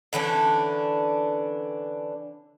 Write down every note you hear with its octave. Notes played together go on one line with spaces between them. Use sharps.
D3 E3 C#4 D4